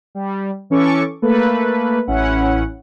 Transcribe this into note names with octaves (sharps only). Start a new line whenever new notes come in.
G3
E3 C#4 A4 C#6 D6
A3 A#3 A4 B4
A1 C#4 E4 F#5